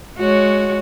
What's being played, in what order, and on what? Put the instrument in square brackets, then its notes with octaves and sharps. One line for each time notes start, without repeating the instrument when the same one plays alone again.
[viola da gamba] G#3 F#4 C#5